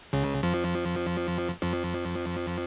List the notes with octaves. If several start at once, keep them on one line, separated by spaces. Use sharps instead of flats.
C#2 C#3
F2 F3
F2 F3